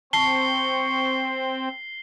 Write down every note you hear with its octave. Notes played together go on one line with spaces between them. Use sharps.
C4 A5 C#6 C7 G7